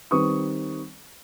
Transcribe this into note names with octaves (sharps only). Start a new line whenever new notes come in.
D#3 G3 C4 B4 C#6 D#6